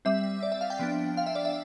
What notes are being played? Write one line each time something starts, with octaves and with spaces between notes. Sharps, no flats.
G3 C4 E5
D5
E5
F5
G5
F3 B3 D4
F5
E5
D5
E5